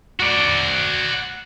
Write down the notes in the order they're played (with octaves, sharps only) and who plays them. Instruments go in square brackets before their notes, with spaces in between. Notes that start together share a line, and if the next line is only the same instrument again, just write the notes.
[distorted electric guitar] F#4 D5